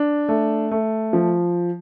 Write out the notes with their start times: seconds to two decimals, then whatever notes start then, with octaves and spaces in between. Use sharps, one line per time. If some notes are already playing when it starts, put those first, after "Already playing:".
Already playing: D4
0.29 A3
0.71 A3
1.13 F3